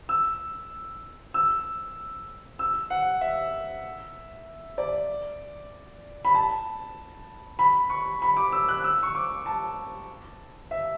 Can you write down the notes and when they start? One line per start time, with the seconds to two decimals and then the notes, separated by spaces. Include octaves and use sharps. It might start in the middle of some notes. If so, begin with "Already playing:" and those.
0.09 E6
1.34 E6
2.59 E6
2.90 F#5
3.21 E5
4.78 D5
6.25 B5
6.35 A5
7.59 B5
7.90 C#6
8.22 B5
8.37 D6
8.52 E6
8.69 F#6
8.84 E6
9.03 C#6
9.15 D6
9.46 A5
10.71 E5